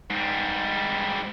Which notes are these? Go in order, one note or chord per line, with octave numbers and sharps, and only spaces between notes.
G#2 G3